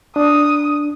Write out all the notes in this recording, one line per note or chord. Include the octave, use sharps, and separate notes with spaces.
D4 D#6